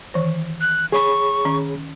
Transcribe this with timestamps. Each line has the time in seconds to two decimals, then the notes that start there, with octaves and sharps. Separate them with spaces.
0.14 D#3 E3 C5
0.60 F#6
0.92 G#4 C#5 B5 C#6
1.45 D#3 C#4